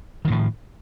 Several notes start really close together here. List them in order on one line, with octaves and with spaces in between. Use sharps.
D#3 F#3 A2 F3